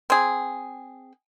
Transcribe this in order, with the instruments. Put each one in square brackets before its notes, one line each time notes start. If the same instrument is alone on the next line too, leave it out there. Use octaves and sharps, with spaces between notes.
[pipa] C4 G#4